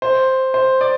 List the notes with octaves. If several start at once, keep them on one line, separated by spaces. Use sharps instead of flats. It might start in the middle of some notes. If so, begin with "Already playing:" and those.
C5
C5
D5